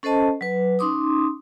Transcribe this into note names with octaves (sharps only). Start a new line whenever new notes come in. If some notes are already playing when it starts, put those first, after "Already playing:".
C#4 A4 C5 D#5 A5
F#3 B4
C#4 D#4 C6 D6 D#6